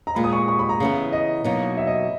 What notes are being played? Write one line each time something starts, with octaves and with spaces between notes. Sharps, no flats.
A#5
A#2 G#3 B3 B5
D#6
C#6
C#6
B5
A#5
C#3 E3 B3
D#5
B2 F#3 A#3 D#4
E5
D#5